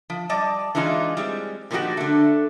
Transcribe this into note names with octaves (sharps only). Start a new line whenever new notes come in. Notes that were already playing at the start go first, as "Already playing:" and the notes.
F3
G3 D5 D#5 A5
E3 G#3 D4 D#4 F4
G3 G#3 C4
A#2 D#3 F3 B3 F#4 G4
D3 A3